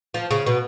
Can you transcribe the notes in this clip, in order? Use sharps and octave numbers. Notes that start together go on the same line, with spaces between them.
F3
C#3
B2